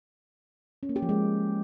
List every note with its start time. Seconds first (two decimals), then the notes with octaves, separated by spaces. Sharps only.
0.83 C#4
0.89 A#3
0.96 G4
1.02 F3
1.09 G#3